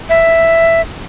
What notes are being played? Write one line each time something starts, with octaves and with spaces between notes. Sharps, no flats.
E5